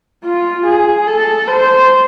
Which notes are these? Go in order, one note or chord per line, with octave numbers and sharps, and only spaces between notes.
F4
G#4
A4
C5